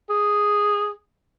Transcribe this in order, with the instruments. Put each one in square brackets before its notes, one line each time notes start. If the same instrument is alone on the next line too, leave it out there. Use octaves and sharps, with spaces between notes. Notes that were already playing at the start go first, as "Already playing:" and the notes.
[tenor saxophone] G#4